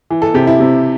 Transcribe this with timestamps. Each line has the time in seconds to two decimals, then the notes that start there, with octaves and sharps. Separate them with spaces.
0.10 E3
0.22 A4
0.34 C3 G4
0.47 E4
0.60 C3